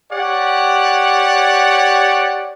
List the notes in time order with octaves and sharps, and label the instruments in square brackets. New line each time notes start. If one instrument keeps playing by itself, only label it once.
[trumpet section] G4 C#5 D5 F#5